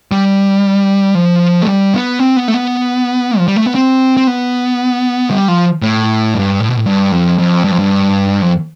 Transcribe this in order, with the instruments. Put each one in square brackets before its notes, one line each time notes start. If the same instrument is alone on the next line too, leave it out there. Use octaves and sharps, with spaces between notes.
[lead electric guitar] G3
F3
A3
G3
B3
C4
B3
A3
B3
F3
G3
A3
B3
C4
C4
B3
G3
F3
A2
G2
A2
B2
A2
G2
F2
F2
G2
F2
G2
F2